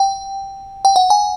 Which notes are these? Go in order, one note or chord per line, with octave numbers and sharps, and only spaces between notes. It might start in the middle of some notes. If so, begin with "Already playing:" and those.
Already playing: G5
G5
F#5
G#5